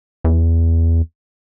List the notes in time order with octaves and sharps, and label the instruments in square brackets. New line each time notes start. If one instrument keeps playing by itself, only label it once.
[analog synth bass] E2